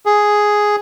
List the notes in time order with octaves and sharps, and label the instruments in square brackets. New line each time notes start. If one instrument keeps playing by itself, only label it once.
[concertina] G#4